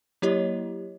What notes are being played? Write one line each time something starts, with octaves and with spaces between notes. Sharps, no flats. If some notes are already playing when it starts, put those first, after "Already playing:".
F#3 A#3 E4 G4 C#5 D#5